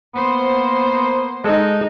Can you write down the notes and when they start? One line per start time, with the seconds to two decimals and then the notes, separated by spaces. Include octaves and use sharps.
0.15 A#3 B3 C5
1.44 G#3 D#4 A4